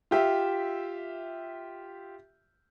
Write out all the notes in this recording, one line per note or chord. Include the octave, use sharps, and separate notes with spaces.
F4 G4 E5